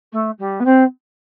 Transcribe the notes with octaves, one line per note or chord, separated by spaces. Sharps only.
A3
G3
B3
C4